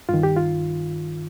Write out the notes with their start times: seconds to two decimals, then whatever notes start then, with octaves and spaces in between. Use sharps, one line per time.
0.09 G2 D#3 F4
0.23 G4
0.36 F4